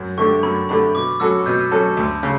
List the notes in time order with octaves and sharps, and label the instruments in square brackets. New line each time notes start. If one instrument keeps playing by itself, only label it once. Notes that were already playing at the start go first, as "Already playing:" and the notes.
Already playing: [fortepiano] F#2
[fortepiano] D3 A3 D4 G4 [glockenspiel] C#6
[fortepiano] F#2 [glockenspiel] B5
[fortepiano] D3 A3 D4 G4 [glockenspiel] B5
[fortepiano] B2 [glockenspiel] D6
[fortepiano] F#3 C#4 F#4 A4 [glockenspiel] E6
[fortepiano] B2 [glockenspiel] G6
[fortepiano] F#3 C#4 F#4 A4 [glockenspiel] A5
[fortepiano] D2
C#3